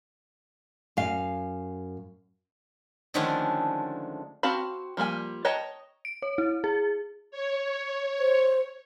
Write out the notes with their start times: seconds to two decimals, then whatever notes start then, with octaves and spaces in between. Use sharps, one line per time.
0.97 F#2 F5
3.14 D3 D#3 F3 G#3 A3 C#4
4.43 C4 F#4 F5 A5 B5
4.97 F3 G3 A#3 G#5
5.45 C#5 D#5 G5 A5 A#5
6.05 D7
6.22 C#5
6.38 E4
6.64 G#4
7.31 C#5
8.19 C5